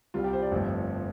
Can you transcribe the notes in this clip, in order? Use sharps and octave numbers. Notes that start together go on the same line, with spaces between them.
C2 C3 G3 F4
G4
C5
D5
G1 F2 F3 A3